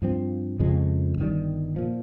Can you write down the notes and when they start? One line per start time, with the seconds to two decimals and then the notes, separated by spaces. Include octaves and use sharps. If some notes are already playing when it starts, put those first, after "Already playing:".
0.02 G2 F3 C4
0.60 F2 C#3 F3 G#3
1.18 G1 G2 D#3 G3
1.76 A#2 F3